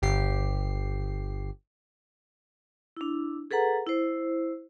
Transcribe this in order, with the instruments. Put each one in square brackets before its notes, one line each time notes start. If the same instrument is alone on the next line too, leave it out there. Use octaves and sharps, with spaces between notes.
[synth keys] G1 G4 C7
[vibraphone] D4 E4
G#4 A4 B4 F#5 A#5
E4 C5